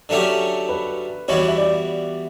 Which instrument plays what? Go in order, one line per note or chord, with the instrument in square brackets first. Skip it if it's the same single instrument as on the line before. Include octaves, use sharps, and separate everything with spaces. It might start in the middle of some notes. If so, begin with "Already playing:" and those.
[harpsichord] D3 F#3 A3 C#4 G4
[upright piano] B4
[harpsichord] E3 G3 B3 F#4 [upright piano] C#5
[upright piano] D5
E5
D5